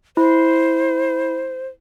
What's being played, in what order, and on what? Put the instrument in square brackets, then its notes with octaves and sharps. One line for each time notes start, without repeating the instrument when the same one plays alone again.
[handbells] E4 [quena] C5